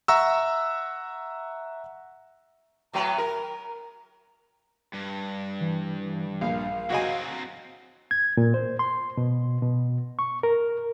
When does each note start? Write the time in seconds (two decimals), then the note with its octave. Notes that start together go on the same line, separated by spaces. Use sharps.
0.08 E5 F#5 A#5 C#6 E6
2.93 A2 F#3 B3 A#5
3.18 A#4
4.94 G2
5.61 E3
6.41 A#1 F5
6.90 F#3 C4 F#4 D#5 G#5
8.11 G#6
8.37 A#2
8.54 C5
8.79 C6
9.17 B2
9.62 B2
10.19 C#6
10.43 A#4